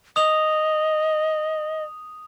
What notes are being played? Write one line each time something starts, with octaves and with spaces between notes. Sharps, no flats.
D#5 D#6 F7